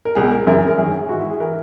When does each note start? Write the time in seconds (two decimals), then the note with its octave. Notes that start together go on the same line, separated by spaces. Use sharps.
0.05 A#4
0.15 C#2 B2 G#4
0.31 A#4
0.47 F#2 C#3 E3 A#4
0.57 G#4
0.67 A#4
0.78 F#2 D#3 G#4
0.94 G#4
1.09 G#2 E3 F#4
1.19 E4
1.30 G#4
1.40 E3 A#4